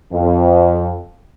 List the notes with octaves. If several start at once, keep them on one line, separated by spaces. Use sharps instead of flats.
F2